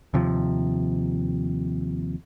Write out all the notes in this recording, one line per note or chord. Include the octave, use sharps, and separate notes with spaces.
D#2 C3 F3